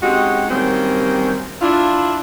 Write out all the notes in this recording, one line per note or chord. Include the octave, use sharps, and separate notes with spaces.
G#3 C4 C#4 D#4 F#4 G4
D#3 F#3 G3 A#3 C4 C#4
D4 E4 F4